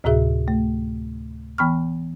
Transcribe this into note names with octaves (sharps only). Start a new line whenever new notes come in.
D2 A2 C3 F#4 G#4 E5
A3
E3 B3 G5 B5 C#6 F6